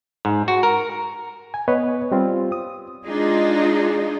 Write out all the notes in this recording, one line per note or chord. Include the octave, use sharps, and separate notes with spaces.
G#2
F#4
A#4
G#5
B3 B4 C#5 D#5
G3 C4 F4
D#6
G#3 D4 D#4 F4 G#4